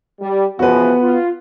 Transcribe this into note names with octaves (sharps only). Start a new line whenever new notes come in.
G3
C#3 E3 F3 B3 F#4 B4
F4